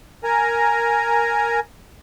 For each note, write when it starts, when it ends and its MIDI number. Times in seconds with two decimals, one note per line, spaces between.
0.24 1.60 70
0.24 1.60 80
0.24 1.60 82